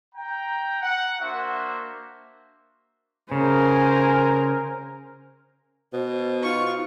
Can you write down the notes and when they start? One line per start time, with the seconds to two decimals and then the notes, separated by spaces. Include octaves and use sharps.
0.15 G5 A#5
0.82 F#5
1.21 A#3 D4 F#4 C5 E5
3.32 C#3 A#4 C5 G#5
5.93 B2 C5
6.43 D#4 F4 C#6